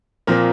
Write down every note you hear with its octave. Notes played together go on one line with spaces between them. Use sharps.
A#2 F3 A#3 C4 A#4